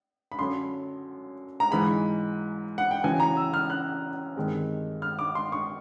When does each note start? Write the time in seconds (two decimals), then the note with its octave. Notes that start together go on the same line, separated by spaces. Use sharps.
0.32 B5
0.39 F#2 D3 F#3 C6
1.60 A#5
1.71 G#2 E3 G#3 B5
2.78 F#5
2.91 G5
3.04 F#2 C#3 E3 G#5
3.20 A#5
3.37 E6
3.54 F6
3.70 F#6
4.36 G2 D#3 G#3 C4
5.02 F6
5.19 D6
5.35 C6
5.52 C#6